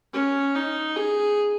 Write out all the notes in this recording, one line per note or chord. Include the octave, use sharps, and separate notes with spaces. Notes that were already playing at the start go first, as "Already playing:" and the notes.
C#4
D#4
G#4